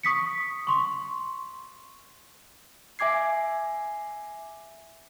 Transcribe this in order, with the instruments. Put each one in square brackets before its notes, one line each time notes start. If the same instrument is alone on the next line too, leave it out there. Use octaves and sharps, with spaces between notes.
[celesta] C#6 D#6 B6 C#7
C6 C#6
[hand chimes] E5 G#5 D6 G#6 C7